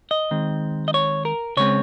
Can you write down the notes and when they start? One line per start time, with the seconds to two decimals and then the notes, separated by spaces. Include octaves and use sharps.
0.11 D#5
0.31 D#3 G#3 C4
0.88 D#5
0.94 C#5
1.25 A#4
1.57 C#3 G#3 C4 C#5